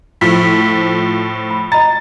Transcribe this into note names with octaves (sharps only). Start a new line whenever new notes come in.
A2 F3 B6
B5
D#5 A#5 A6